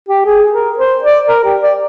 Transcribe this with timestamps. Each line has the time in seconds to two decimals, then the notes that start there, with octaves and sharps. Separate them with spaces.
0.09 G4
0.26 G#4
0.52 A#4
0.78 C5
1.03 D5
1.28 A#4
1.45 G4
1.62 D5